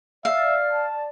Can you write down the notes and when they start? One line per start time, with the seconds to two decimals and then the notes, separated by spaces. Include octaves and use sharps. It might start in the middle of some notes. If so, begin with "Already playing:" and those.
0.25 D5 E5 F5
0.72 A5